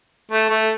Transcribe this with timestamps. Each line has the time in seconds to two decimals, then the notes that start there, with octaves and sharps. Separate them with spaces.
0.32 A3
0.50 A3